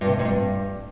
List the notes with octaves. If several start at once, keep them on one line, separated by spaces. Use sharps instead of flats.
G2
C3
F2
G#2
G2